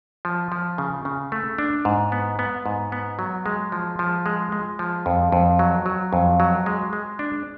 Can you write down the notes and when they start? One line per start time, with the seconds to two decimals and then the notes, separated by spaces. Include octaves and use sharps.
0.25 F3
0.52 F3
0.78 C#3
1.05 C#3
1.32 A3
1.58 D4
1.85 G#2
2.12 B3
2.39 B3
2.66 G#2
2.92 B3
3.19 F#3
3.46 G#3
3.72 F3
3.99 F3
4.26 G#3
4.52 G#3
4.79 F3
5.06 F2
5.32 F2
5.59 F#3
5.86 F#3
6.13 F2
6.40 F#3
6.66 G#3
6.93 G#3
7.19 D4